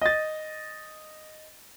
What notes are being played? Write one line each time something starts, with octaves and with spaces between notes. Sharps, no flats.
D#5 A6